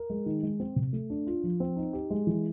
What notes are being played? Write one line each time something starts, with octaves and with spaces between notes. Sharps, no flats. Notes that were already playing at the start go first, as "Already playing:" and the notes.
Already playing: A#4
G#3
D#3
G#3
C4
C3
A3
D4
F4
F3
C4
D#4
G4
G#3
E3